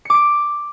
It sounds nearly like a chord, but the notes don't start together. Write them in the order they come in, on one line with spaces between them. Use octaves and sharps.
C#7 D6 D7